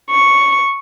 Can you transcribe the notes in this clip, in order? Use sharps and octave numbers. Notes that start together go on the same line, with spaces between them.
C#6